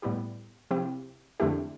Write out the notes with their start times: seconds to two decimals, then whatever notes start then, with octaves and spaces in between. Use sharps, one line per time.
0.02 A2 G3 B3 E4 G4
0.71 C3 F3 C4 E4 G4
1.40 F2 D3 A3 E4 G4